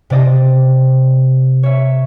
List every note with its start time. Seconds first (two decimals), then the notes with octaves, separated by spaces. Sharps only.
0.10 C3 C4 D5 D#5
1.63 C#5 E5